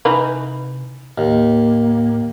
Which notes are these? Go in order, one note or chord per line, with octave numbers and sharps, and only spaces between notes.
C3 E3 D#4 B4
D#2 A2 A#3